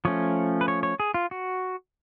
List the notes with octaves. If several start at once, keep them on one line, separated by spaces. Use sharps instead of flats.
F3 A3 C#4 C#5
B4
C#5
C#5
G#4
F4
F#4